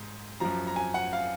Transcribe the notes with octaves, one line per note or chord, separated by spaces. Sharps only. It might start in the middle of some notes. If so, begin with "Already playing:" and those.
Already playing: G#2
F#2 F3 A#5
A#5
G#5
F#5
F5